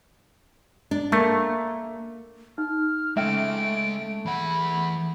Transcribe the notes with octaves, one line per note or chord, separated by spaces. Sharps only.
D4
A3 A#3
D#4 F6
G#3 A3 C#4 E5 G5 D7
E3 F#5 B5